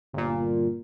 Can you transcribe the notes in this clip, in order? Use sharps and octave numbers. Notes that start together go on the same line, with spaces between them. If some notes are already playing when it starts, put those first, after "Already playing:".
G1 A#2